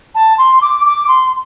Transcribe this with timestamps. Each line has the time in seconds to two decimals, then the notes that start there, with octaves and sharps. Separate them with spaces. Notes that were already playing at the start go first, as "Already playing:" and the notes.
0.15 A5
0.38 C6
0.62 D6
0.85 D6
1.08 C6